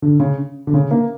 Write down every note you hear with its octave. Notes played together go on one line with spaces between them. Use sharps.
D3
C#3
D3
C#3
A#3